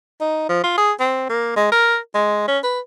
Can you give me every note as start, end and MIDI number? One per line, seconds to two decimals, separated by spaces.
0.21 0.48 63
0.49 0.62 53
0.63 0.73 65
0.78 0.92 68
1.00 1.25 60
1.29 1.52 58
1.56 1.68 56
1.72 1.98 70
2.15 2.44 56
2.48 2.59 61
2.64 2.79 71